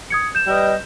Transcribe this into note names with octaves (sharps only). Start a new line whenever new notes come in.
D#6 G#6 C#7
G6 E7
G3 B4 D#5